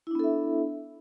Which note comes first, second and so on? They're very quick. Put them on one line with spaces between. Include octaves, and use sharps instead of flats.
E4 D4 B3 A4 E5